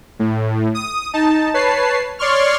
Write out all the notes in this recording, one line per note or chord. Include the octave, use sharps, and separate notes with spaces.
A2
D#6
D#4 A5
B4 C#5 A5 C7
C#5 D5 C6 C#6 F6